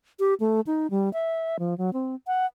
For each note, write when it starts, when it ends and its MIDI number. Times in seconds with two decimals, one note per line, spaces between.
0.19 0.34 67
0.40 0.61 57
0.67 0.87 63
0.91 1.11 55
1.13 1.57 76
1.59 1.76 53
1.78 1.90 54
1.93 2.15 60
2.27 2.46 78